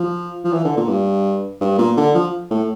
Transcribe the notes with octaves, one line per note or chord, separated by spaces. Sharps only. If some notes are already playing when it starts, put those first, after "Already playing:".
Already playing: F3
F3
E3
D3
A#2
G2
G2
A#2
D3
F3
A2